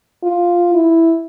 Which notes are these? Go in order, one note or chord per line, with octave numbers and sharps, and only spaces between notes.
F4
E4